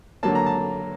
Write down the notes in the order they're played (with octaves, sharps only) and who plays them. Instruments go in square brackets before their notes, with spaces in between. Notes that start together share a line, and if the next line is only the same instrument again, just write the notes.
[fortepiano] D3 F#3 A#3 A5
A#5
A5